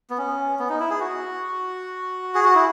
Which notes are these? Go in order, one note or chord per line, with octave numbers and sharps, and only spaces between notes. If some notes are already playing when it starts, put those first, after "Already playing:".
B3
C#4
B3
D#4
E4
G#4
F#4
G#4
F#4
E4